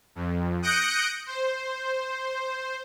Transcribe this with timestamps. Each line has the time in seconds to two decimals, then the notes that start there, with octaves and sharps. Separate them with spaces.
0.15 F2
0.62 D#6 F#6 G6 A#6 C#7 D7
1.26 C5